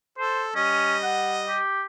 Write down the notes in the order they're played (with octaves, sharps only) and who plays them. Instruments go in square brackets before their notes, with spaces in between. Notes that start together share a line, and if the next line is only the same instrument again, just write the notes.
[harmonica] A4 [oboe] C5
[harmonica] G3 D#5 [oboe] C#4
[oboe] F#5
G4